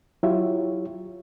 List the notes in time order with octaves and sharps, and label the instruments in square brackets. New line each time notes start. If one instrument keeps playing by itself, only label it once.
[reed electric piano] F#3 E4 F4 G4 C#5 E5